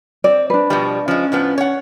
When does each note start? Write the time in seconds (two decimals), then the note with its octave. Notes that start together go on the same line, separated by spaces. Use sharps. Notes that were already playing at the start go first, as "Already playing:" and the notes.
0.24 C4 D5
0.50 D4 B4
0.70 B2 F3 G3
1.08 F3 G#3 C#4
1.32 A2 F3 B3
1.58 C#5 F#5